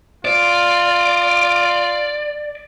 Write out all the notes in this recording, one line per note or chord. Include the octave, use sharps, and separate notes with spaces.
F4 D5